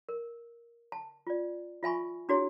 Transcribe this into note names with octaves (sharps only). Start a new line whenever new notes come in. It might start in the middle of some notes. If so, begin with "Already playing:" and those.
A#4
A5
F4 D5
F4 E5 G#5 B5 C#6
D4 E4 F#4 G#4 C#5